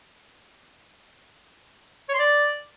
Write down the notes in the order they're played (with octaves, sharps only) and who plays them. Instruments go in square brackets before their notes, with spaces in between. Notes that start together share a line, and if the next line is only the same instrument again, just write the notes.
[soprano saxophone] C#5
C6
D5